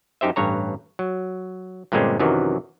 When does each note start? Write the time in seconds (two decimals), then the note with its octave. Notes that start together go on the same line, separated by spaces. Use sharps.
0.21 F#2 D#4 G4 C5 E5
0.36 A1 G2 C#5 A#5
0.99 F#3
1.92 G2 A#2 D3 G#3 C4 C#4
2.19 F#2 C3 D#3 E3 F#3